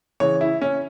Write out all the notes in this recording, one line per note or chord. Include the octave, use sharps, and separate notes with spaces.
C#3 E3 C#5
E4
C#4